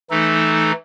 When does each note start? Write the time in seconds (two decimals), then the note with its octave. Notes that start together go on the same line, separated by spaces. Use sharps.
0.10 E3 A3 D#4 A4